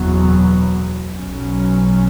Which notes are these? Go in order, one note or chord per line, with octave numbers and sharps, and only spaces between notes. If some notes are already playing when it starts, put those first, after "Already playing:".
Already playing: F#1 E2 B2 F#3
B1 B2 F#3 C#4